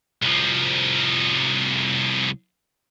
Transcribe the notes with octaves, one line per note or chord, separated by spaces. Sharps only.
C2 F3